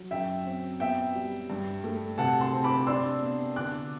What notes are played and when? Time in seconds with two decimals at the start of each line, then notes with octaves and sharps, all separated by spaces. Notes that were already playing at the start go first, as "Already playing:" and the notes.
Already playing: F#3
0.11 F#2 E5 G5
0.45 C4
0.80 B3 E5 G5
1.15 G3
1.50 G2
1.84 A3
2.18 C3 F#5 A5
2.41 A5 C6
2.53 C4
2.64 B5 D6
2.87 D4 C6 E6
3.22 B3
3.56 D3 D6 F#6